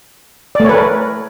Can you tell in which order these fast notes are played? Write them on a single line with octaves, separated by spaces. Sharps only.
D5 A3 C#5 B4 A#4